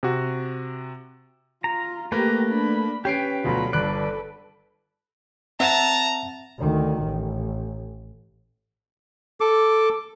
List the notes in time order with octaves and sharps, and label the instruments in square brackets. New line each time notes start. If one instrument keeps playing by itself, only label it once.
[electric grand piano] C3 F#4
[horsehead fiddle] F4 [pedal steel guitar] A#5
[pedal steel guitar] A3 B4 [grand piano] A#3 [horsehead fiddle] G4 A#5
[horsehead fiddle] D4 B5
[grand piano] C#4 C7 D7 [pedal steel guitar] G4 B4 [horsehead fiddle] G5
[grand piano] D2 B2 F#3 [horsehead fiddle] F4 B5
[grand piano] G1 F#6 [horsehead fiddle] A4 B4 [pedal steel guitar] D5
[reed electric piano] C4 F#5 [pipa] E5 [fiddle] A5 [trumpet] A#5
[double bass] D2 D#3
A1
[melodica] A4 D6